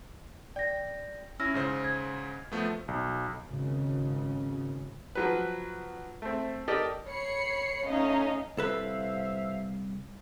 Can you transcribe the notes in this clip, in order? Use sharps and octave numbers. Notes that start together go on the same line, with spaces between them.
D5 G5 A#6
C#4 E4 E6 F6 A#6
G#2 C#3 C5
G#6
F3 A3 B3
B1
G#1 C#3
F3 F#3 B4
A3 C4
G4 A4 A#4 D5 D#5
C#5 B5 C7 C#7
A3 C#4 D#4 D#5 F5
C2 A4 B4 C5 E5 F5